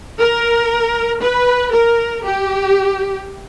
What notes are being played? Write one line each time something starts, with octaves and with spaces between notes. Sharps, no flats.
A#4
B4
A#4
G4